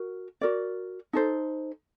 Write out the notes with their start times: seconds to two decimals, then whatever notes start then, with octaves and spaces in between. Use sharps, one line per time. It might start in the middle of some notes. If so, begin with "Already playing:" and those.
Already playing: F#4 A#4
0.41 F#4 A#4 D5
1.13 D#4 A4 C5